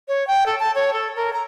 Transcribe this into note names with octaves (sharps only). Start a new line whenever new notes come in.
C#5
G5
A4
A5
C#5
A4
A#4
A#5